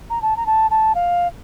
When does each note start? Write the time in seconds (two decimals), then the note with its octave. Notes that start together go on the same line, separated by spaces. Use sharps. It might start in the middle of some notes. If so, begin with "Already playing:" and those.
0.10 A#5
0.22 A5
0.37 A#5
0.46 A5
0.71 A5
0.95 F5